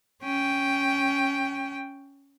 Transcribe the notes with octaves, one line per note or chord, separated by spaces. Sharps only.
C#4 G5